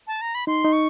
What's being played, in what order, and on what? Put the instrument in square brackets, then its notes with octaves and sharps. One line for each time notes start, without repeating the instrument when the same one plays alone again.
[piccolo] A5
A#5
B5
[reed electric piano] D#4 [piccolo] C6
[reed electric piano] D#4
[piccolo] C#6